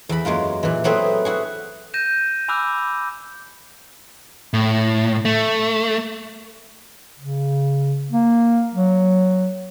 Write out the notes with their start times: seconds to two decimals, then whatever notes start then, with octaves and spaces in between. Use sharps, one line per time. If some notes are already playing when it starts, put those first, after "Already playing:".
0.09 E2 B5
0.25 F#2 G#3 A#3 F4
0.63 A#2 E3
0.84 F#3 A3 B3 C4 G#4 B4
1.25 E4 F#4 G#4
1.94 G6 A#6 D#7 E7
2.48 G#5 B5 D6 E6 F#6
4.54 A2
5.25 A3
7.19 C#3
8.12 A#3
8.74 F#3